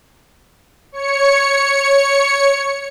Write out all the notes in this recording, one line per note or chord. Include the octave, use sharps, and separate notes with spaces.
C#5 C#7